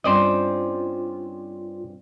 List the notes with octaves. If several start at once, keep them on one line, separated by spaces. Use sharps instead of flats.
G2 C4 C#4 F4 C5 D5 D#5